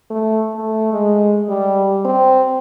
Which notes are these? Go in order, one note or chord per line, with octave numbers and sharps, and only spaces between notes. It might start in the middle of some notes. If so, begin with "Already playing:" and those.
A3
A3
G#3
G3
C4